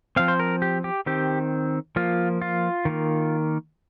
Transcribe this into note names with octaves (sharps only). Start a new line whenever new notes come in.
F3 C4 F5
C5
A#4
G4
G4
D#3 C4 G4
F3 A#3 F4
F4
D#3 A#3